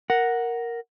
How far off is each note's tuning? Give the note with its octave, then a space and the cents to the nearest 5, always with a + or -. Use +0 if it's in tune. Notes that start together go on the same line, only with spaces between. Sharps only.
A#4 +0 F#5 +0